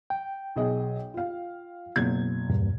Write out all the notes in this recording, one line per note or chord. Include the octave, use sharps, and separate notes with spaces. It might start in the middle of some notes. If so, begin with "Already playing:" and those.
G5
B1 G#4 D#5
F4 F5
F#1 B2 G#6
E2 G2 A#2